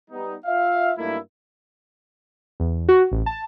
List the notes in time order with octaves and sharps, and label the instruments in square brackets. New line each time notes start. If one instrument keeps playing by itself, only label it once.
[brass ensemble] G3 B3 D#4
F4 E5 F5
G2 F#3 A3 A#3 D#4 E4
[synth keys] E2
F#4
A1
A5